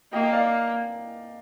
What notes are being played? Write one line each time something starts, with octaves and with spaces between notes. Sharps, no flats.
A#3 D#5 G5
D#5 G5
D5 F5